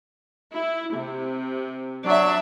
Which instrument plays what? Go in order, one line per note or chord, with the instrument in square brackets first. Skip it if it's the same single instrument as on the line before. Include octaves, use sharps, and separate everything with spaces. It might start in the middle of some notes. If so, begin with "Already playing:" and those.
[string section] E4
C3
[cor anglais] F#3 [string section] D4 E5